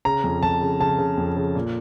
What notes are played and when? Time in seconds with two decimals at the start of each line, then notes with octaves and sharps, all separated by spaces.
0.05 C#3 A#5
0.24 F2
0.43 F2 A5
0.61 C#3
0.80 C#3 A5
0.99 C#3
1.17 F2
1.37 C#3
1.55 A#2